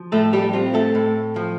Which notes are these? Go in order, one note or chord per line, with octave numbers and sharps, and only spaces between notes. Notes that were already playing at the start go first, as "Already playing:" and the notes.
Already playing: F3
A2 A3 A4
G3 G4
C4 F4
A3 A4
A2
F3